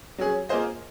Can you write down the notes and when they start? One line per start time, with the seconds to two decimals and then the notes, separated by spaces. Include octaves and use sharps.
0.18 F#3 C#4 G#4
0.49 A#3 F4 G#4 C5 D#5